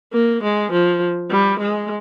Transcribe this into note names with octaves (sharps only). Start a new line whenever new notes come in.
A#3
G#3
F3
G3
G#3